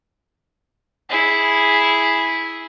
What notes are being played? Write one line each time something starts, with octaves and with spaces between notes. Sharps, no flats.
E4 G#4